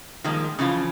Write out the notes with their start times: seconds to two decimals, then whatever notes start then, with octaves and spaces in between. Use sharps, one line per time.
0.24 D#3 F3 G3 G#3 A#3
0.59 C#3 E3 F3 F4